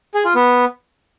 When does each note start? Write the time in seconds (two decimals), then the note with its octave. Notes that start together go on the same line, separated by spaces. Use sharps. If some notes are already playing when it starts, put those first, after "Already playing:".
0.14 G#4
0.25 F4
0.35 B3